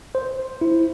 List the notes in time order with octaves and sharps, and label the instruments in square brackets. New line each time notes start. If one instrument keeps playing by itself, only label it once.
[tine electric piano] C5
E4